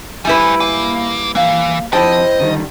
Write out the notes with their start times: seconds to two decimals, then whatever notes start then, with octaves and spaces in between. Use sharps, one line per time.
0.25 G3 E4 B4 C5 G#5
0.60 A#3 G#5
1.35 E3 A#3 F5
1.93 F2 E4 G4 C5 D#5 G5 A5
2.40 D3 D#3 G3